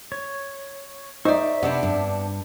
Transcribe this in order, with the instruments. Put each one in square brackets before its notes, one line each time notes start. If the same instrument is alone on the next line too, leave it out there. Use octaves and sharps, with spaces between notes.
[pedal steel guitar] C#5
[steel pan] D#4 [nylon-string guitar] C5 D5 [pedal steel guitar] E5 C#6
[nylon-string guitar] C3 [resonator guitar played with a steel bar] B3 C4 D4
[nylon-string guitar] G2